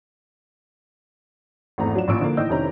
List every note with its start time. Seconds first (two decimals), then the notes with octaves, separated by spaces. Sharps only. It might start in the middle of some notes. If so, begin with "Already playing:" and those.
1.78 G#1 E2 A3 A#5
1.95 F#3 D4 F4 E7
2.08 A1 A#2 C#6 E6 D7
2.21 D3 F3 A#3
2.37 A2 D#3 D5 D#5 E6 G6
2.49 F1 C3 D#3 C#4 E4 A#5